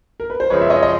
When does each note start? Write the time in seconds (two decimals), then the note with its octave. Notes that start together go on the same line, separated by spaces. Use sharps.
0.20 A#4
0.30 B4
0.40 C5
0.50 F#2 C#3 F3 G#3 B4 C#5
0.61 E5
0.70 C#5 D#5
0.83 D#5